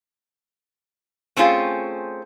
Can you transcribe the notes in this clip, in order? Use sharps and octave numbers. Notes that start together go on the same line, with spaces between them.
A3 C4 C#4 F4 G#4